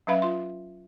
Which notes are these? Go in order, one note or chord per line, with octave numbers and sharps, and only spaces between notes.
F#3 C#4 B4 E5 F5 B5
F4 C6